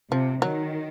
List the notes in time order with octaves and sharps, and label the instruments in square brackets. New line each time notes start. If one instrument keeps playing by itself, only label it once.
[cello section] C3 [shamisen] F3
[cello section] D#3 [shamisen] F#3